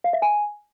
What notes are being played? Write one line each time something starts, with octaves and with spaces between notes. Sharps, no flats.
F5
E5
G#5